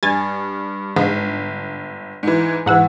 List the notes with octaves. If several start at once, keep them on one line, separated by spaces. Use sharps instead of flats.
G2 G#5 A6
G1 G#2
G#2 E3
E2 G#2 E3 F#5 E6